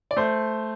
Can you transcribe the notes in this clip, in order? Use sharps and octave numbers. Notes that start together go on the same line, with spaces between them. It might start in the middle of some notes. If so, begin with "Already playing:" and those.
D5
A3 C5